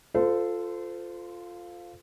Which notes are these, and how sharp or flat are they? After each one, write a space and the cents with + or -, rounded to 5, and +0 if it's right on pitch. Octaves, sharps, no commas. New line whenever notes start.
F4 +5 A4 +0 C5 -30